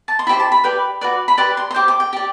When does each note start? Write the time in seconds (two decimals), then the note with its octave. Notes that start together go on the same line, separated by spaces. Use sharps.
0.08 A5
0.19 C6
0.27 E4 G4 C5 B5
0.40 A5
0.52 B5
0.64 G4 B4 D5
1.01 F#4 B4 D5
1.28 B5
1.38 G4 B4 D5 C6
1.57 C6
1.71 C6
1.74 G4 C5 D6
1.88 D6
2.00 G5
2.13 G4 D5